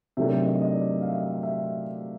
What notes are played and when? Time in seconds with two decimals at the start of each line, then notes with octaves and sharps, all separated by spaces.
0.17 C3 D#3 F#3 A3 D4 E5
0.45 D#5
0.61 D#5
0.73 D5
1.01 F5
1.09 E5
1.18 D#5
1.26 E5
1.43 E5